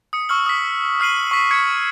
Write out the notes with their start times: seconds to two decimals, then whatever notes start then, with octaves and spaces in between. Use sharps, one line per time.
0.13 D#6 C#7
0.29 C#6 E6 F6 F#7
0.46 D#6 B6
1.00 D#6 F6 C7 D#7 F#7
1.31 C#6 B6
1.51 C#6 G#6 B6 C#7